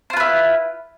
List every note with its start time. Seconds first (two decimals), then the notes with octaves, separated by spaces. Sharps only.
0.10 C5
0.13 F4
0.17 B4
0.20 E4